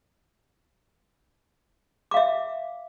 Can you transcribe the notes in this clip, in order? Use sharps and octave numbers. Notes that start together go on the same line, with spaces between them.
E5 F5 D6